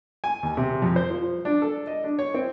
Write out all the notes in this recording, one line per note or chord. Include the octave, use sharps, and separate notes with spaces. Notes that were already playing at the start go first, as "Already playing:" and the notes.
G#5
D#2
C3
F2
C5
F3
D4
A4
D#5
D4
C#5
C4